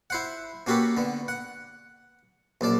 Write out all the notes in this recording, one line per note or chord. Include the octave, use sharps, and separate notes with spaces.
E4 C5 F#5
A#3 C#4 F#4 G4 A4 B4
D3 B3
F#5
A#1 F#2 D5 A5